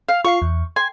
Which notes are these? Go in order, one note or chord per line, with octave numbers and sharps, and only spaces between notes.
F5
F4 F5 C#6 C7
E2
G#5 C6